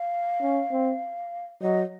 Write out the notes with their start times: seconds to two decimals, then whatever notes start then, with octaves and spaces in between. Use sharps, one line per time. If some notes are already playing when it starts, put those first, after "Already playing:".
Already playing: F5
0.41 C#4
0.71 C4
1.62 F#3 D#5